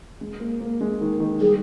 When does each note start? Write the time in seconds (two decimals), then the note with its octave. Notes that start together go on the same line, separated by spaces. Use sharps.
0.21 G#3
0.40 A#3
0.61 A#3
0.81 G#3
1.01 D#3
1.20 D#3
1.41 G3 G#4